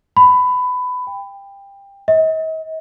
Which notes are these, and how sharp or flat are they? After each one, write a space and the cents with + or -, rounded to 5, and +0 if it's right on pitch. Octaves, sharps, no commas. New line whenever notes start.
B5 +20
G5 +20
D#5 +45